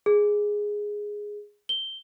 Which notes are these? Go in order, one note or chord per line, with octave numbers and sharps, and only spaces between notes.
G#4
G7